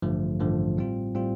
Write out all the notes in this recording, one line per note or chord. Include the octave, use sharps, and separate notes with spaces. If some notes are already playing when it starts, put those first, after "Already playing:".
A1 G2 D3 F3 A3
A1 G2 D3 F3 A3
A2 G3 C4 F4
A2 G3 C4 F4